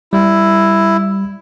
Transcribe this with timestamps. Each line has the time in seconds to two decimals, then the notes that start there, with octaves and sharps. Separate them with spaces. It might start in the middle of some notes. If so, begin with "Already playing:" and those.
0.13 G3 E4